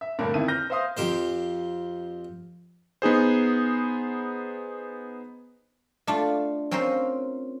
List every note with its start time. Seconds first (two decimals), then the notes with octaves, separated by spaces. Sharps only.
0.01 E5
0.19 G2 A#2 D3 A3 A#3
0.34 F2 D#3 E4 D#7
0.48 F6 G6 A#6
0.70 C5 E5 F5 C6 D#6
0.97 F2 G4 C5
3.02 B3 D#4 G#4 C5
6.07 A3 D4 F4
6.71 C4 C#4 F4 A#4 C5